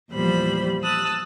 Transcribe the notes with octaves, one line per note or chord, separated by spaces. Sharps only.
E2 A#2 F3 G3 C5 B5
A5 D#6 E6 F#6